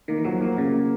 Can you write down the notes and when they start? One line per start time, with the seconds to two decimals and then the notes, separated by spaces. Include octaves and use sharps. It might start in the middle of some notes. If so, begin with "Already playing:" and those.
0.08 D#3 A#3
0.17 E3
0.24 F3 F#3
0.41 F3 A#3
0.57 C#3 A#3
0.74 A#3